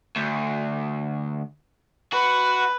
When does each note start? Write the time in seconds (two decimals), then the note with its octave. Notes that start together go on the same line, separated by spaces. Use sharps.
0.16 D2
2.13 F#4 B4